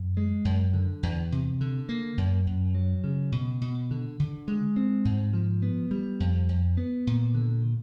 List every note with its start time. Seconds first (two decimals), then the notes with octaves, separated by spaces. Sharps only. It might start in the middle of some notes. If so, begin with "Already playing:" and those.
Already playing: F#2
0.17 G#3
0.45 F#2
0.73 D3
1.03 E2
1.32 C3
1.61 D3
1.89 A#3
2.18 F#2
2.47 F#2
2.75 F#3
3.04 C#3
3.32 B2
3.61 B2
3.91 D3
4.20 D3
4.48 G#3
4.76 C4
5.05 G#2
5.33 F3
5.62 B3
5.91 G3
6.20 F2
6.49 F2
6.77 B3
7.07 A#2
7.35 D3